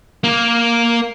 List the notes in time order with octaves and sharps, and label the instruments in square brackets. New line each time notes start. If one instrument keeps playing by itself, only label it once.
[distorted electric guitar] A#3